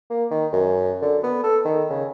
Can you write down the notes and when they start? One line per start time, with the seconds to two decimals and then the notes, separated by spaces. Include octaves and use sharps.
0.10 A#3
0.31 D#3
0.53 F#2
1.02 D3
1.23 B3
1.44 A4
1.65 D#3
1.90 C#3